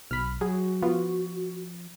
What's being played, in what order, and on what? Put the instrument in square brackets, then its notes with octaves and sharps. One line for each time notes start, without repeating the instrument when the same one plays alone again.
[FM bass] B1 [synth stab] B5 F6
[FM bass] F#3 [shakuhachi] F#4 [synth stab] G#4
[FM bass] F3 [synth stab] B3 F4